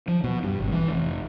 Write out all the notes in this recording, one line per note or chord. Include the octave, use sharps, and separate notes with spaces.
F3
B2
G2
G#1
E3
F1